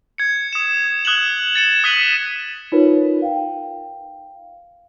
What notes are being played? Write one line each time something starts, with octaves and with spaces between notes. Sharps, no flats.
G#6 C#7
D#6 E7
D#6 F#6 G#6 E7 F#7
A6 C#7 E7
D#6 F#6 B6 C#7 D#7 F#7
D#4 F4 A#4 B4 C#5
F5 G5